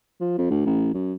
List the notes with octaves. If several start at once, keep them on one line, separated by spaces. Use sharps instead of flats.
F3
F2
D2
A1
F#2